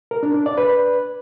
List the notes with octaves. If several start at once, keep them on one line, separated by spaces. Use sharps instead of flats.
A#4
D4
D4
D5
B4